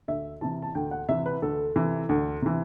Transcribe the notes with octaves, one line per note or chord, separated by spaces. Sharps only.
D2 E5
C3 E3 A5
A5
D2 G5
F#5
C3 E3 E5
B4
D2 A4
C3 E3
D2
C3 E3